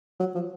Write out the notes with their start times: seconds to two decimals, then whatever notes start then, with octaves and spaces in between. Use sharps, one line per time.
0.20 F#3
0.35 F3